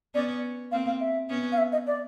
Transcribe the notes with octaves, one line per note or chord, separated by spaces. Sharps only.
B3 C#4 D5
A#3 C4 F5
F5
E5
B3 C#4
F5
E5
D#5
D5